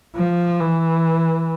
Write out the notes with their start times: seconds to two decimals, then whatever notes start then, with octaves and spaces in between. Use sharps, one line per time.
0.16 F3
0.60 E3